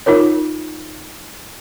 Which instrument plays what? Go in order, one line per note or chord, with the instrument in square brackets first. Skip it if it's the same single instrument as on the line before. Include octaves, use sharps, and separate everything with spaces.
[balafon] D#4 F4 A#4 C#5